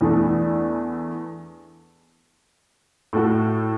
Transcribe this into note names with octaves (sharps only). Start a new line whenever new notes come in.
E2 E3 A3 D4
A2 A3 F#4